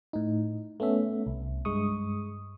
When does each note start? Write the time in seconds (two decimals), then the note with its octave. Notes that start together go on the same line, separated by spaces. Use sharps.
0.13 A2 D#4
0.80 A3 B3 C#4 E5
1.26 C2
1.65 G2 G#3 C#6 D#6